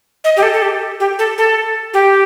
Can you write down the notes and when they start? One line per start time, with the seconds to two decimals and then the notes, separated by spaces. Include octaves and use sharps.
0.24 D#5
0.37 G4
0.43 A4
0.53 A4
0.62 G4
1.00 G4
1.19 A4
1.38 A4
1.93 G4